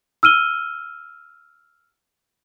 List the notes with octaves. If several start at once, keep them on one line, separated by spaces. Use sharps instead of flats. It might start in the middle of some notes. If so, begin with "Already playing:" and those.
E6 F6 D#7 G7